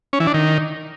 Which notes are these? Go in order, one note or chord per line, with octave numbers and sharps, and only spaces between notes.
C#4
E3
D4
D#3